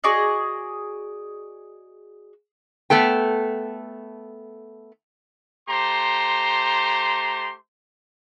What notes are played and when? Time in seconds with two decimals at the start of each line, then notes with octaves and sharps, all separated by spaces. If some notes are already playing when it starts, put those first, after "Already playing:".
0.04 F#4 G#4 D5 D#5
2.90 A3 B3 A4 G5
5.69 A3 G4 C5 A#5 C6